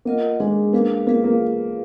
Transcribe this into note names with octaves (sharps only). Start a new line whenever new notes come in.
A#3 F4 A#4 D#5 F#5
G#3 D4 G#4 B4
A#3 D4 G#4 B4 F5
A#3 F4 G#4 B4 F5
A#3